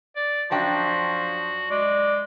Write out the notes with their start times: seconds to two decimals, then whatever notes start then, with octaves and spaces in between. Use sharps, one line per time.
0.16 D5
0.51 F#2 F3 D4 F#4 G5
1.70 G#3 D5